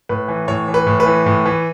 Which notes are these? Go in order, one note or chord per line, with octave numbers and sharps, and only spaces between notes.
A2 B4
E3
A2 C#5
E3
B4
A2
B4
E3
A2
E3